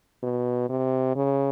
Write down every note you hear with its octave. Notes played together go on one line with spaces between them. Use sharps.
B2
C3
C#3